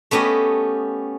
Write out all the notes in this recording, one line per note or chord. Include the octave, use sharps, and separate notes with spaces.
A3 B3 C#4 G4 D#5